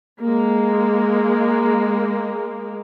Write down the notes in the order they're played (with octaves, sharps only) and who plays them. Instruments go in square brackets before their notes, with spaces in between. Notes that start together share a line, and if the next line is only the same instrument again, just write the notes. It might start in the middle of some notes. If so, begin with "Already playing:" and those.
[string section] G#3 A#3